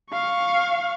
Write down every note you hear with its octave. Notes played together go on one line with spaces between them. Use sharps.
F5 C#6